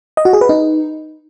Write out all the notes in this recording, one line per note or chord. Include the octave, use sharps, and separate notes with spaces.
D#5
F#4
G#4
B4
D#4